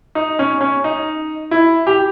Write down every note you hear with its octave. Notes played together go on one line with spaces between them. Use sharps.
D#4
C#4
C#4
D#4
E4
G4